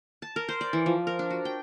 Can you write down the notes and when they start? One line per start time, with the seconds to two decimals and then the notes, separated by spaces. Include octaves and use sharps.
0.22 A5
0.36 A#4
0.49 C5
0.61 D5
0.73 E3
0.86 F3
1.07 A#4
1.19 D4
1.30 F#4
1.45 G5